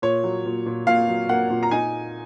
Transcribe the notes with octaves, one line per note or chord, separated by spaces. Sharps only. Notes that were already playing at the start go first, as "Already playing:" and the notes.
A#2 C#5
F#3
A#2
A#2
A#2 F5
F#3
A#3 F#5
A#2
A#5
D#4 G#5